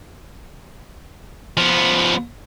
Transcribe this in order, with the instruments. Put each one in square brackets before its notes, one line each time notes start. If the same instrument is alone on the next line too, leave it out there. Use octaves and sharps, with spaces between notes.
[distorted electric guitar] F3 B3